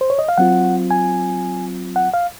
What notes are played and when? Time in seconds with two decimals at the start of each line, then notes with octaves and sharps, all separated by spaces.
0.01 C5
0.10 C#5
0.19 D#5
0.29 F5
0.38 F#3 C4 F4 F#5
0.91 G#5
1.96 F#5
2.14 F5